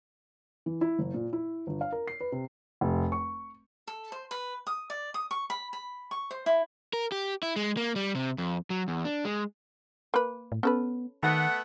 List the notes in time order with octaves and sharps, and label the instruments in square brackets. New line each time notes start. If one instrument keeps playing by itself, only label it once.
[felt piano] E3
E4
F#1
A#2
E4
G1
F5
A#4
C7
B4
C3
[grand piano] F1
C#6
[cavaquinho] A4
C5
B4
D#6
D5
D#6
C#6
B5
B5
C#6
C5
E4
[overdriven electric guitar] A#4
G4
E4
G#3
A#3
G3
C3
F2
F#3
E2
D4
G#3
[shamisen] A#3 B4
[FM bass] A2
[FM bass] B3 [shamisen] C#4 A4 B4
[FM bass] D#3 [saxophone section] A3 B3 F#5